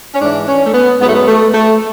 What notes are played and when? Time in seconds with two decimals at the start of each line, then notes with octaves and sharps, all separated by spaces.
0.15 C#4
0.20 G#2 E3 D4
0.47 C#4
0.65 A3
0.73 B3
1.00 G#2 B3
1.04 F#3 A3
1.15 B3
1.27 A3
1.54 A3